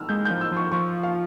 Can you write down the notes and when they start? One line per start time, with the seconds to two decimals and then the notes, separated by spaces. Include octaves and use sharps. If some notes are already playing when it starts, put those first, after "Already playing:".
Already playing: E6 F6
0.09 G#3 G6
0.25 G6
0.30 F3
0.41 E6
0.52 F3 C#6
0.72 F3 C#6
1.03 F5